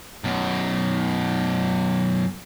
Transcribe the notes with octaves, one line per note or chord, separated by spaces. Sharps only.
F#2 B2